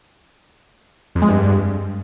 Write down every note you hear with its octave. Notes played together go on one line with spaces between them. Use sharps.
F2
G#3
G2